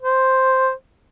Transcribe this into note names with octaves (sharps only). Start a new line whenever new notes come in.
C5